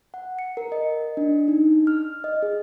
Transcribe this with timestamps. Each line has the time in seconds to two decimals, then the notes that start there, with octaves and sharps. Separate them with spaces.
0.14 F#5
0.39 C#7
0.57 A#4
0.72 D#5
1.17 D4
1.48 D#4
1.87 F6
2.24 D#5
2.43 G#4